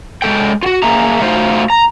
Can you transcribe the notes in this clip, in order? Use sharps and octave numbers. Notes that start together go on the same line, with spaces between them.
G#3 A#3 A4 G5
F4 F#4
A#3 G#4 E5 A#5
A3 D#4 F4 F#4 C5
A#5